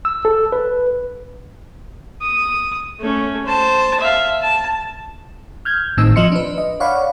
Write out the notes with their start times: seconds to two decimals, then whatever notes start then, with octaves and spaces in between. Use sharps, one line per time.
0.05 E6
0.25 A4
0.52 B4
2.22 D#6
3.00 A3 C#4
3.46 C5 A5
4.00 E5 F5
4.42 A5
5.65 F6 G6 G#6
5.97 G#1 A2 D#3 C4 D#4 E6
6.16 F3 D#5 C6 C#7
6.32 D4 B4
6.58 D#5
6.80 C#5 D5 F5 F#5 B5 C#6